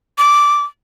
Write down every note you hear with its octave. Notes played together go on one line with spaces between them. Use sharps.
D6